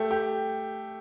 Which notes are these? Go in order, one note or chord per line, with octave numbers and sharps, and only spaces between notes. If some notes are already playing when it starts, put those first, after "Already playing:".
Already playing: A3 G4
G4